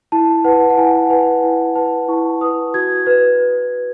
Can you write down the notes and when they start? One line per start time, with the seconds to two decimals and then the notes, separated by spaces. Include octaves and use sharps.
0.12 E4 A5
0.44 B4 F#5
0.70 F#5
0.77 E4 G#5
1.03 F#5
1.10 B4 G#5
1.43 E4 G#5
1.75 B4 A5
2.08 E4 C#6
2.41 B4 D#6
2.74 F#4 G#6
3.07 B4